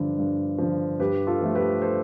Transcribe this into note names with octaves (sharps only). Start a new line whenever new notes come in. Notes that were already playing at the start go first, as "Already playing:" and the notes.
Already playing: G2 D3 F3
G2
D3 F3
G2 G4 B4
F4 A4
F3 A3
G4 B4
A4 C5